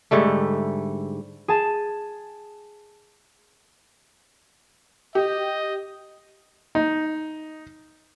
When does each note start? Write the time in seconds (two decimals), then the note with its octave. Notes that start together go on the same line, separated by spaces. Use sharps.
0.11 G#2 D3 G3 A3
1.48 G#4 A5
5.15 G4 D#5
6.75 D#4